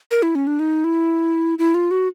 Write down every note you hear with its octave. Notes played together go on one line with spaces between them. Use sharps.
A#4
E4
C#4
D4
D#4
E4
E4
F4
F#4